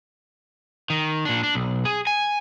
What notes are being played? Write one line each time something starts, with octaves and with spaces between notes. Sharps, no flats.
D#3
A#2 D4
D4
B1
G#4
G#5